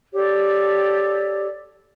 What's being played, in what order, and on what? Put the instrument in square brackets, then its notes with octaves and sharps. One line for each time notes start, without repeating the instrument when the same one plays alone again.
[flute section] G4 A4 C#5 D5